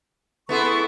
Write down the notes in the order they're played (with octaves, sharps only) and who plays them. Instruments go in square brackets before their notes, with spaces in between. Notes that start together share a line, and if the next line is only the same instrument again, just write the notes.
[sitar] B3 E4 G#4 [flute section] A4 C6 C#6